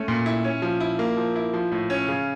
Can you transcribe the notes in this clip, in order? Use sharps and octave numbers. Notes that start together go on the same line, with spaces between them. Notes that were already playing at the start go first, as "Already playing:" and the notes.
Already playing: A3 C#4
A#2
E4
C#4
F3
E4
A#3
F3
E4
F3
A2
C#4
C#3